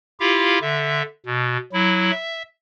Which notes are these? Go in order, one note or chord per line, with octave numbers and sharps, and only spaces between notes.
E4 F4 G4 F5
D3 E5
B2
F#3 E4
E5